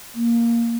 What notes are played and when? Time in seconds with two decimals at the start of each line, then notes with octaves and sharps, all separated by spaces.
0.15 A#3